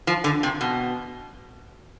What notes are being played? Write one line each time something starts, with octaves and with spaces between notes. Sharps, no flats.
F3
D3
C3
B2